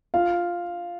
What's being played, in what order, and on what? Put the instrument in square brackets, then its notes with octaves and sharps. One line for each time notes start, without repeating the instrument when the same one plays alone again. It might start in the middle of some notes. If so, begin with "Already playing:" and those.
[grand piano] F4 F5